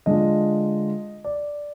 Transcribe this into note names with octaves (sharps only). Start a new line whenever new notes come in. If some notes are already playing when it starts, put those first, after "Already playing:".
D3 G#3 D4 F4 D#5
D5